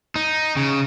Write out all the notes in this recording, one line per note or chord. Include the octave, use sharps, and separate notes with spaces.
D#4
C#3